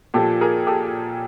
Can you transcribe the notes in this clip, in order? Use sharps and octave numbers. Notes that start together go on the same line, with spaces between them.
A#2 F3 G4 A4
G#4 A#4
G4 A4